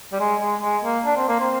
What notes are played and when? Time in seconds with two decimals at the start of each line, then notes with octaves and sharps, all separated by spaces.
0.12 G3
0.20 G#3
0.40 G#3
0.62 G#3
0.84 A#3
1.05 D4
1.17 C4
1.28 A#3
1.40 C4